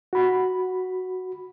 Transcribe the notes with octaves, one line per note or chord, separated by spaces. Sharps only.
F#4 B5